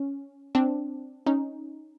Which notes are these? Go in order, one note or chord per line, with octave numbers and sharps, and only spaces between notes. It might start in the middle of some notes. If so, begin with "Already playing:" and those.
Already playing: C#4
C4 D4
C#4 D#4